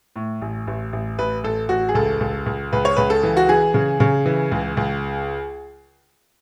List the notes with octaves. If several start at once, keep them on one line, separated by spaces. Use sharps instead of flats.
A2
A1
A1
A1
A1 B4
A1 A4
A1 F#4
G#4
C#2 A4
C#2
C#2
C#2 B4
C#5
C#2 B4
A4
E3
F#4
E3 G#4
C#3
C#3
E3
C#2
C#2